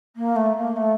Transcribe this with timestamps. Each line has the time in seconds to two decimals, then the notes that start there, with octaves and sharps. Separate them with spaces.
0.16 A#3
0.36 A3
0.56 A#3
0.76 A3